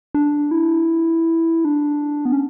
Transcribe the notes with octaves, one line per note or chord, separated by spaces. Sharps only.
D4
E4
D4
B3
C#4